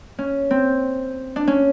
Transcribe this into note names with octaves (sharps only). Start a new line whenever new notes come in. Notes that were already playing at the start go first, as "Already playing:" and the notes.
C#4
C4
D4
C#4